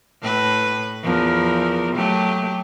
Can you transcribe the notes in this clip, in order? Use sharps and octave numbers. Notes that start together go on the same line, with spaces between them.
A2 B4
E2 F3 A#4
F#3 A3 G4